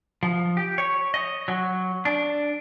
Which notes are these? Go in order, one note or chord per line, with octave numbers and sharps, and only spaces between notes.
F3
G4
C#5
D#5
F#3
D4